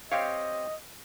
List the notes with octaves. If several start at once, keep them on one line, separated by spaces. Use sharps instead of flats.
C4 G4 C#5 D#5 F5